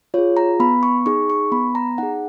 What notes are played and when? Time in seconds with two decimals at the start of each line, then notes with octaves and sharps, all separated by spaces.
0.14 F4 G#4 C#5
0.37 A#5
0.60 B3 B5
0.83 C#6
1.06 D#4 G#4 C#6
1.30 C#6
1.52 B3 B5
1.75 A#5
1.98 D#4 G#4 F#5